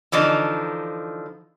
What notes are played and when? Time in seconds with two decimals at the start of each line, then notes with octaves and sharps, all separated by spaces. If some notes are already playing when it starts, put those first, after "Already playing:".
0.12 D3 E3 F3 D4 D#4